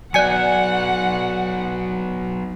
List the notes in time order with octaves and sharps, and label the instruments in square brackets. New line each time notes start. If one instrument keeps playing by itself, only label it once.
[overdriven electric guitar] F#3 B3 [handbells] D5 G#6 C#7 [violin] F#5 [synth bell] G#5 F#6